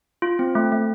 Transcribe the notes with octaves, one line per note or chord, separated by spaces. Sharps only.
F4
C4
A3
A3